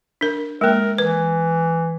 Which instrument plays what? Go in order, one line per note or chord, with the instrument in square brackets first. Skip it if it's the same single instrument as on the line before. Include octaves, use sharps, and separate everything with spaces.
[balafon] D4 A#4
[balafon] G#3 A#3 [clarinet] A#4
[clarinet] E3 [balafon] B4